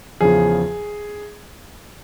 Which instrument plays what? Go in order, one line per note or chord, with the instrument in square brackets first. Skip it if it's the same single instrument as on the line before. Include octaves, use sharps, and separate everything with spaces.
[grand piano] E2 C#3 F3 G#4